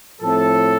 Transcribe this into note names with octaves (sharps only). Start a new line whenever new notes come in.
A2 F3 A3 C4 A4